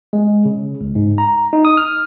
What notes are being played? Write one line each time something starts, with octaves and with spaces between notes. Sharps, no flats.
G#3
C#3
C#2
G#2
A#5
D#4
D#6
F6